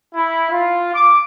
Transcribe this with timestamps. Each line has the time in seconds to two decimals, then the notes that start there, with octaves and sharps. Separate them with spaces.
0.15 E4
0.51 F4
0.95 D6